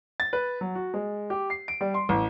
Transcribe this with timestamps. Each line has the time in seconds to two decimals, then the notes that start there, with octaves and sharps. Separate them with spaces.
0.20 A6
0.33 B4
0.61 F#3
0.75 F#4
0.94 G#3
1.30 G4
1.50 C7
1.68 D7
1.81 G3
1.94 C6
2.09 A1